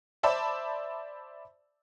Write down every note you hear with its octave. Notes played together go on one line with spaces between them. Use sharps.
C5 D5 E5 A5 B5